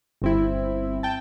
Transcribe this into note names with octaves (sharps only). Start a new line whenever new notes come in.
G1 C4 E4
G5 A5